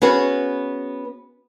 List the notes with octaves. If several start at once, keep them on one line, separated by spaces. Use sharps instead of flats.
B3 C#4 F#4 G#4 B4